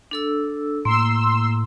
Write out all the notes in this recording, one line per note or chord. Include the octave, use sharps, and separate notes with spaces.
D4 A4 E6
A2 A#3 C6 E6